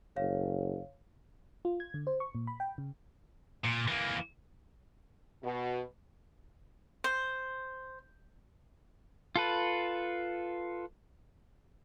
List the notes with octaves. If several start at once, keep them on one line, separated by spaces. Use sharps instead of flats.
F#1 C#5 F5
F4
G#6
D3
C5
C#6
A#2
B5
G5
C#3
A#2
E3 A#3
B2
C5
F4 A4 B4